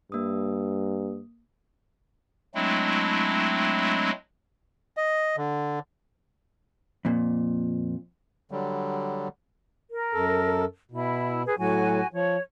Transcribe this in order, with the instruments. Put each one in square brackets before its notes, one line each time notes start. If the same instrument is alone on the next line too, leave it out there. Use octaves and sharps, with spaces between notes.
[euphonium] G2 [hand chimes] A#3 D#6
[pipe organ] F#3 G#3 A3 C4 D4 E4
[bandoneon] D#5
D3
[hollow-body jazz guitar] F2 A#2
[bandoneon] D3 F#3 G3
[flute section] A#4
[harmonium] F#2 A4
[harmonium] B2 [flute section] E4
[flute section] G#4 B4
[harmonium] A2 F#3 [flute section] F#4 G#5
[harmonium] F3 [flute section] C#5